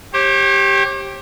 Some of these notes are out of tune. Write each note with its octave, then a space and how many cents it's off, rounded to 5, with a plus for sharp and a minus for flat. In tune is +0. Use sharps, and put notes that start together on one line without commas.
G4 +0 C#5 -45